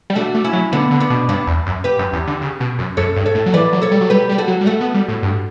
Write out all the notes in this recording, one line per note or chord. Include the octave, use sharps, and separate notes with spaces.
G3
A3 D4 F#4
A3
C#4 E4
F#3
D3 B3 D4
D3
B3 D4
B2
G2 B3 D4
E2
F#2
G4 B4
F#2
E2
D3
C#3
B2
F#2
F#2 A4 C#5
G2
A4 C#5
A2
F#3
E3 B4 D5
F#3
A4 C#5
G3
F#3
G3 G4 B4
G3
B4
F#4 A4
F#3
G3
A3 F#4 A4
B3
G3
A2
G2